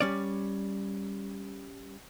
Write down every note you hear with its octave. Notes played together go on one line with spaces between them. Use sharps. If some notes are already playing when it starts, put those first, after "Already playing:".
G3 C#4 D5